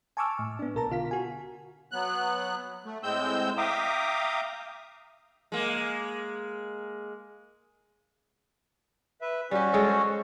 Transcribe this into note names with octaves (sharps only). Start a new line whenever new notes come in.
G#5 A5 C#6 D6 E6 F6
A2
B3 D4
B1 B2 A#4 A5 A#5
B2 D3 F4 F5 B6
F#4 G#5
F#3 B3 F#6
A3
A2 G#3 C4 E6 G6
E5 F5 G5 A#5 D6 D#6
G#3 A#3
B4 E5
G3 C#4 F#4 G4
G#3 A4 C#5
C5